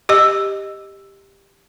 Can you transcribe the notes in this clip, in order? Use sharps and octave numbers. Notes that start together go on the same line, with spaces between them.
G4 D#5 E6